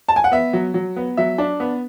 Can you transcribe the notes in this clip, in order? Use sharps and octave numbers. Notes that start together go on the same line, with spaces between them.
A5
G#5
F#5
B3 E5
F#3
F#3
B3
F#3 E5
D4
B3